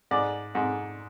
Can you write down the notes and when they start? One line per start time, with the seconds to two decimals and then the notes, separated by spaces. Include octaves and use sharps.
0.11 G#2 D5
0.55 G#2